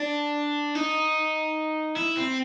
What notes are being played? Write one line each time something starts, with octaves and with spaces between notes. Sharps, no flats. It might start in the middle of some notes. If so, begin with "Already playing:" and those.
Already playing: D4
D#4
E4
C4